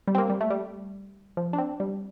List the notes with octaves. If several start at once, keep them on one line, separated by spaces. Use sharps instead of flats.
G3
C4
A#3
G3
A3
G3
F3
D4
C4
G3